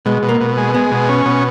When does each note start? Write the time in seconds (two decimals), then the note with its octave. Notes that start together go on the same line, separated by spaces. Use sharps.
0.05 B2 G#3
0.22 B2
0.29 A#3
0.41 B2
0.57 G#3
0.74 G#3 B3
0.91 B2
1.09 C#4
1.25 B2